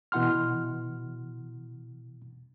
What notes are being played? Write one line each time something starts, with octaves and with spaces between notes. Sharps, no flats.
B2 E3 E4 F#5 C6 F6